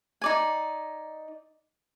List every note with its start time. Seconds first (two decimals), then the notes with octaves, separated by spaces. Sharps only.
0.21 D#4 D5 G#5